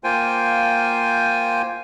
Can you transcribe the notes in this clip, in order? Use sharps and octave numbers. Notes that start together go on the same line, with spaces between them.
A#3 F4 C5 G5 G#5